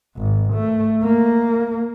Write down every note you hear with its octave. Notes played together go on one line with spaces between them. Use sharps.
G#1
A3
A#3